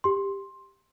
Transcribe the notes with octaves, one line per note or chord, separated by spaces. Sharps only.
G4 C6